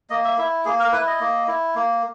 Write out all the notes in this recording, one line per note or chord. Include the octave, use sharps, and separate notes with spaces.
A#3 D#5
E5
E4 E5
A#3 G#4
A#4
E4 B4
D#5
A#3
E4
A#3